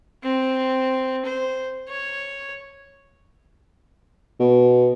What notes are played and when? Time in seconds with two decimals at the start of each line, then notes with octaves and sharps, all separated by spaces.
0.23 C4
1.26 C5
1.89 C#5
4.40 B2